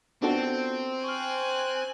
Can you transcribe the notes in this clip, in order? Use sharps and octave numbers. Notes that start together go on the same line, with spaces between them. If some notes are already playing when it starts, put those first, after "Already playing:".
B3 C4 D4 F4 F#4 A4
G#5 C#6 F6 F#6